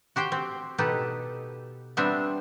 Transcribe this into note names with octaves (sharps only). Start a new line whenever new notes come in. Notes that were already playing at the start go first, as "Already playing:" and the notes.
F#4 G4 C5 G5
C4
B2 D#4 G4 A4 B4
G3 B3 C4 D4 E5